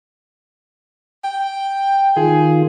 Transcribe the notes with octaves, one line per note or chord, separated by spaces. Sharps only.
G5
D#3 F4 G#4